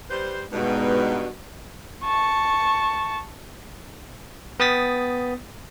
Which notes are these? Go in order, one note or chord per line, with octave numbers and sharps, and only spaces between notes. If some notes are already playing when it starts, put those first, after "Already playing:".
G3 B4 C5
G2 B2 G#3 B3 D#4
A5 C#6
B3 G5 D#6 A6 B6